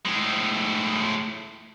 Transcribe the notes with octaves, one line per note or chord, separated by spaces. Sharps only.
A2 G#3